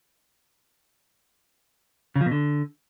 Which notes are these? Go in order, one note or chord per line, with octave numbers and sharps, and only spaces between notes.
C#3
F3
B2
D3